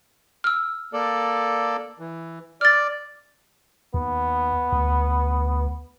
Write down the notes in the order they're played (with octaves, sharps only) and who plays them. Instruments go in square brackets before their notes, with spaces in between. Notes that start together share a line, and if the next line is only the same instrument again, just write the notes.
[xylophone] E6 F6
[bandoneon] A#3 A4 D5
E3
[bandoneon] D5 [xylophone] F6 A6
[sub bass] D#2 [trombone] B3
[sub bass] D2